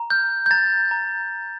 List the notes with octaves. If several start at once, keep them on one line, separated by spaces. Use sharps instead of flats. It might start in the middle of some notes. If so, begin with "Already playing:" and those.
Already playing: A#5
F6 G6
G6
A#5 A6
A#5